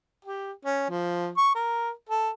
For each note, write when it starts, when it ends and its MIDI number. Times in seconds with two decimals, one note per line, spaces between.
0.25 0.52 67
0.65 0.85 61
0.89 1.29 53
1.37 1.51 85
1.55 1.91 70
2.09 2.30 69